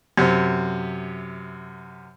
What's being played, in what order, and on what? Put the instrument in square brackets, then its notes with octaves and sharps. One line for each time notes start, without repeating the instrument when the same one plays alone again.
[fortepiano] F#2 C3